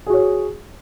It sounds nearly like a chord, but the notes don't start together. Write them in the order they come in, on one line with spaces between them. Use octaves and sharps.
G#4 F#4 C#5